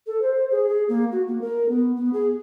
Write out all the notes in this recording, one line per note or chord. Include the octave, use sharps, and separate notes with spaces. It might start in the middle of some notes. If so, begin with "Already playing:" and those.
A4
C5
G#4
G#4
A#3
F#4
A#3
A#4
B3
B3
G#4